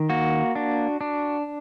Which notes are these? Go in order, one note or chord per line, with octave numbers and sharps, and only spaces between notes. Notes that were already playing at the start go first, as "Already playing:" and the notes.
Already playing: D#3
A#3 F#4
D4
D4